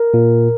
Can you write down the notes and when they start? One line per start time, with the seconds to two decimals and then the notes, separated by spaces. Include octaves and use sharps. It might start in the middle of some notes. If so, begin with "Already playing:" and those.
Already playing: A#4
0.14 A#2